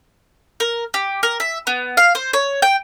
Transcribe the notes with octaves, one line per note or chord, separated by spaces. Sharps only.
A#4
G4
A#4
E5
B3
F5
C5
C#5
G5